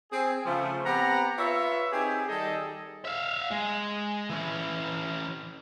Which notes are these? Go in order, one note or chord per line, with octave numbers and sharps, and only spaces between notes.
C4 G#4
C#3 F3 A3
B3 C4 G4 F#5 A#5
F4 B4 C#5 E5
C4 D#4 G4 G#4
D#3 G3 D#4 G#4 A4 D#5
E5 F5
G#3
E3 C#4